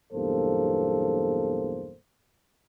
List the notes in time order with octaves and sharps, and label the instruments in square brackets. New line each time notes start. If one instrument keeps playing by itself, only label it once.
[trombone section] B1 E2 G2 A#3 A4 C5